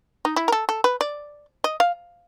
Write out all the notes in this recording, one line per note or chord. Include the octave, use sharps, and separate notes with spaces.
D#4
E4
A#4
A4
A4
B4
D5
D#5
F5